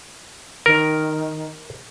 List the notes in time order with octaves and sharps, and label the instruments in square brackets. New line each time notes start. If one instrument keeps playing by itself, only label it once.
[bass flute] D#3 [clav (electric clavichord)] A#4